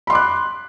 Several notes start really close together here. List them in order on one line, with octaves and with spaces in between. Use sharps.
B5 C6 D6 F#6